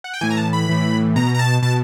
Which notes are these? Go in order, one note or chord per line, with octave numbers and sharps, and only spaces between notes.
F#5
G5
A2 E3 G#5
A#5
A5
B5
A2 E3
B2 A#5
A#5
A5
B2 A5